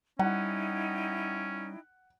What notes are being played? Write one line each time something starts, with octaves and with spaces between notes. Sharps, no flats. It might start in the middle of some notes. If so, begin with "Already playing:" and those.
G3 C#4 D#4 E4 F#5 G5